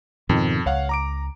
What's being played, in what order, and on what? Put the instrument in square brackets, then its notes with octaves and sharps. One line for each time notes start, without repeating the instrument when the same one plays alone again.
[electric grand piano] F2 [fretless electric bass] G#2 B2 D#3
[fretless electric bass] C#2 [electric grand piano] C#5 F5 F#5
[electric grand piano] A#5 D6 D7